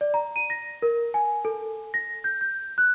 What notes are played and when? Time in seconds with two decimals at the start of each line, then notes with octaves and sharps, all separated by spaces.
0.01 D5
0.14 A#5
0.36 D#7
0.50 A#6
0.82 A#4
1.14 G#5
1.45 A4
1.94 A#6
2.24 G6
2.41 G6
2.78 F#6